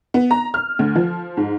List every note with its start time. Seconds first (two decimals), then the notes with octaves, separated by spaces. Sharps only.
0.14 B3
0.31 A#5
0.54 F6
0.79 D2
0.95 F3
1.37 G#2